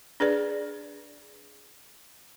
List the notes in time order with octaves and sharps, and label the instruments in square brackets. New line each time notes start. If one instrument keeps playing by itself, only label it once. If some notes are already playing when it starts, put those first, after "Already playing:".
[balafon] D4 G#4 B4 D5